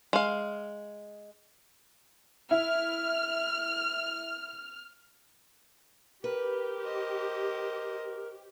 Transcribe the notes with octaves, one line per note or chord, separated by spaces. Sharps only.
G#3 F5
E4 F6
G4 A#4 B4
C5 D#5